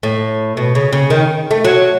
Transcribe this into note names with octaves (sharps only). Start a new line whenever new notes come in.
A2
B2
C#3
C#3
D#3
A3
F#3